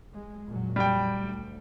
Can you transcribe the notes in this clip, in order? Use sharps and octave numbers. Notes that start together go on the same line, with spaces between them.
G#3
F2 A#2 F#3
G3 G5
D2